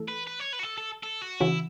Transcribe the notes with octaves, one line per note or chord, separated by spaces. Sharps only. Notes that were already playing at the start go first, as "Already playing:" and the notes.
Already playing: E3 A3 A4
B4
B4
C#5
B4
F#4
A4
A4
A4
F#4
C#3 E3 C#4 E4 F#4